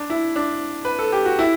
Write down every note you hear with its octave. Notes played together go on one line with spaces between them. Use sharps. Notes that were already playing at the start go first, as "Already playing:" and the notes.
Already playing: D4
E4
D4
B4
A4
G4
F#4
E4